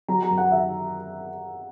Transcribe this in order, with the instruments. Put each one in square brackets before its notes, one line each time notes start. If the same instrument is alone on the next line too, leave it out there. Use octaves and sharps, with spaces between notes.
[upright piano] F#3 A#5
A#5
F#2
F#5
D#3 E5